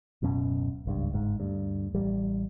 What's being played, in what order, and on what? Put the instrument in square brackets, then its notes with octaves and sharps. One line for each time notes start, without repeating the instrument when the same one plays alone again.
[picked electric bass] D1 F#2 B2 C#4
G#1 C#2 G2
G1 G#2
D2 G2
A1 G3